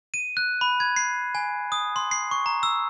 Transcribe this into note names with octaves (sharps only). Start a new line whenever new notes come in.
D#7
F#6
B5
G#6
C7
G#5
D#6
C6
C7
C#6
A#5
E6